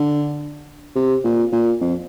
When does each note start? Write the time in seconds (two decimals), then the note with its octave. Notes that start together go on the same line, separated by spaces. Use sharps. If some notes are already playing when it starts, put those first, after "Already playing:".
Already playing: D3
0.96 C3
1.24 A#2
1.52 A#2
1.81 F2